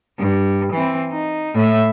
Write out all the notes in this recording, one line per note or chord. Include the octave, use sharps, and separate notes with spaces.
G2
E3 C4
D#4
A2 E5